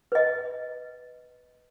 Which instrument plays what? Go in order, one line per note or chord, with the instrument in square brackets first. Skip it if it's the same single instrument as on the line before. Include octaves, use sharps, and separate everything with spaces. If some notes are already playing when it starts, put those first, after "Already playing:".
[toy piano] B4 D#5